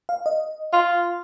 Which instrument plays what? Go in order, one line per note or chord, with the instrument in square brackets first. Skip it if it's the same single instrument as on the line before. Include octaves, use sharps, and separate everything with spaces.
[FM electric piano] F5
D#5
[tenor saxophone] F4 [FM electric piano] F5